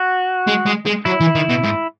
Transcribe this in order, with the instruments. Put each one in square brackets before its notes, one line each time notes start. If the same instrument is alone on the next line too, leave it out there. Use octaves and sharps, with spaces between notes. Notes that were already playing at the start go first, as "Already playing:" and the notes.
Already playing: [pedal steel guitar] F#4
[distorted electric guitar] G#3
G#3
G#3
[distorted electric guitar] F#3 [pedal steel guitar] E4
[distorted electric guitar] E3
D#3
B2
G#2